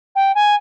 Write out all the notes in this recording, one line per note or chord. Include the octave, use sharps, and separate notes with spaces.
G5
G#5